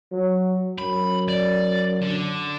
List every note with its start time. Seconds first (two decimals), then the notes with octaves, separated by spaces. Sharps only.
0.12 F#3
0.79 F#2 B5
1.29 D5
2.02 D3